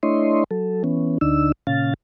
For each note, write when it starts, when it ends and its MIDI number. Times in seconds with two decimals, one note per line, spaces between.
0.03 0.44 57
0.03 0.44 62
0.03 0.44 64
0.03 0.44 73
0.03 0.44 75
0.03 0.44 84
0.51 0.83 54
0.51 0.83 69
0.84 1.18 52
0.84 1.18 59
0.84 1.18 61
1.21 1.52 38
1.21 1.52 50
1.21 1.52 62
1.21 1.52 63
1.21 1.52 88
1.67 1.94 46
1.67 1.94 49
1.67 1.94 61
1.67 1.94 77
1.67 1.94 93